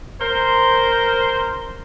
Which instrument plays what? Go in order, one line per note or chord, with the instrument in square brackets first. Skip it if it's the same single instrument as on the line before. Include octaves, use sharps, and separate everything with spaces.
[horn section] A#4 C5